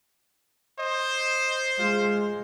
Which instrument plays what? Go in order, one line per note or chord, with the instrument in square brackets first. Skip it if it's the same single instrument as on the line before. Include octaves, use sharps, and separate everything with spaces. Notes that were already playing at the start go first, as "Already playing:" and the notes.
[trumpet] C5 [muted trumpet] D#5
[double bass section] G#3 [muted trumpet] F4